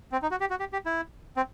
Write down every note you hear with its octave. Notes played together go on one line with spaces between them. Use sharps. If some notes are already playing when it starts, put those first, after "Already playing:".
C4
D#4
F#4
G4
F#4
G4
G4
E4
C4